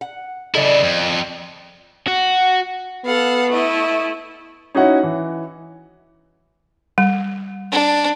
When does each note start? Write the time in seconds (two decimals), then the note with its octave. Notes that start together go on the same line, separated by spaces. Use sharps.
0.01 F#5
0.55 C#3 E4 A4 D5 D#5
0.84 F2
2.07 F#4
3.05 B3 A4 F5 F#5
3.50 A3 E4 D#5
4.75 C#4 D#4 E4 F#4 C#5 F#5
5.03 E3
6.98 G3
7.72 D4